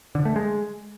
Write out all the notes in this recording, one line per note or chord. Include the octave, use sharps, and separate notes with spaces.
D3
A3
G#3